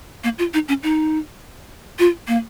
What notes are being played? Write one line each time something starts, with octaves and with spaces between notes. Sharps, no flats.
A#3
F4
D#4
C#4
D#4
F4
A#3